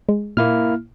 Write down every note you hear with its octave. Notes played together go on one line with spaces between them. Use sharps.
G#3
A#2 A#3 E4 F6